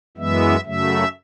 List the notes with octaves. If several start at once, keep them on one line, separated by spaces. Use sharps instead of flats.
F#2 E3 G#3 B3 E5
F#2 C#3 F#3 A3 E5